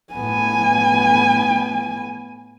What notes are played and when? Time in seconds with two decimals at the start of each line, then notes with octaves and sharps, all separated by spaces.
0.14 A2 B3 G#5